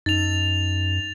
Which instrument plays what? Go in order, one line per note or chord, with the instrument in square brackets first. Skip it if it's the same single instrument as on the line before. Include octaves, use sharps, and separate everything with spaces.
[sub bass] F#2 [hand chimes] D#4 [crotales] A6 F7